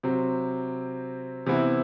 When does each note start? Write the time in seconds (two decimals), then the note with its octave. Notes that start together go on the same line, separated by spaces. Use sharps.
0.03 C3 F#3 C4
1.46 C3 E3 B3 E4